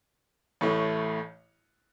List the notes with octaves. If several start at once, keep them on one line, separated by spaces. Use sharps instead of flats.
A1 A2 A3 C#6